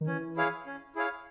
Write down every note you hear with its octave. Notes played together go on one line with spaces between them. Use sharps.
D#3
E3 C#4
E4 G#4 C#5 F5
C#4
E4 G#4 C#5 F5